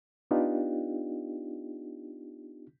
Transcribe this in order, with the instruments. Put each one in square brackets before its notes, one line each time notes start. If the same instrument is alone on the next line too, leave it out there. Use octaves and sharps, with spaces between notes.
[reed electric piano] B3 D4 D#4 F4 G4